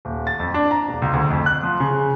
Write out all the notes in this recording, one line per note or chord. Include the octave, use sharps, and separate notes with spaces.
D#1
A6
F2
D4
A#5
E1
C#2
D2
F2
F#6
F3
C#3